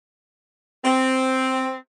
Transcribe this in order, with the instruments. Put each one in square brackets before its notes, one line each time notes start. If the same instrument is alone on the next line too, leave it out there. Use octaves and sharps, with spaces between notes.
[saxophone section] C4